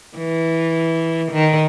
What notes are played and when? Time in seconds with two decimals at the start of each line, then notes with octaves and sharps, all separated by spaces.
0.18 E3
1.32 D#3